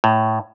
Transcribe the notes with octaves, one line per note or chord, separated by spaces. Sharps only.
A2